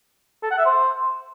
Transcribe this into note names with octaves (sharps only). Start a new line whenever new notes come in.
A4
F#5
E5
C5